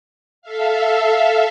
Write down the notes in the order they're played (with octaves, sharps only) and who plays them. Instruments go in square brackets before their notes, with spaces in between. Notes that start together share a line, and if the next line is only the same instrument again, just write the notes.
[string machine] A4 E5 F5